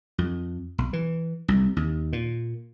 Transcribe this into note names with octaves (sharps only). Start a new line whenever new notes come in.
F2
B1
E3
C2
D#2
A#2